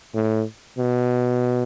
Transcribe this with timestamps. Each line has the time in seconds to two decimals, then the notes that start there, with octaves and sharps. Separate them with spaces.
0.15 A2
0.79 B2